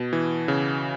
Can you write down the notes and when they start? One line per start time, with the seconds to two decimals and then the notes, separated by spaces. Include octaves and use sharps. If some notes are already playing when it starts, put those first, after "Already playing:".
Already playing: B2
0.13 E3
0.48 C#3